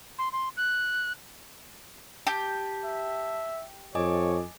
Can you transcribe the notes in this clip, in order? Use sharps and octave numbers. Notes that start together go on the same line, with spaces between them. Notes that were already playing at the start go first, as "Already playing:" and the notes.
C6
C6
F#6
G4 A5
E5
F2 C#5 D#5 G#5 D6